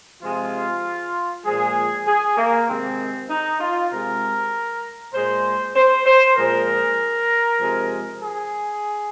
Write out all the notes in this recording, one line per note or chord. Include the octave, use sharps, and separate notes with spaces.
C3 F3 G#3 F4
A#2 F3 G#3 G#4
G#4
A#3
C3 D#3 G#3 C4
D#4
F4
C3 G#3 A#4
A#2 G#3 C5
C5
C5
A#2 F3 G#3 A#4
C3 F3 G#3
G#4